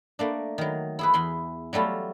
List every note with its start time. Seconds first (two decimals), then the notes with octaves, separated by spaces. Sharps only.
0.19 A3 A#3 D4
0.58 D#3 F#3
0.99 E4 G#4 B4
1.14 E2 G#5 B5 C6
1.73 F#3 G3 A3 F4